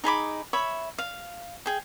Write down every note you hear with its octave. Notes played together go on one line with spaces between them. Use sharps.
D#4 G#4 B5 D6
C#5 E5 B5
F5
G#4 G5